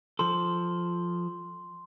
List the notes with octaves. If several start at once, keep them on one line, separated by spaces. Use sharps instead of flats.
F3 A4 C6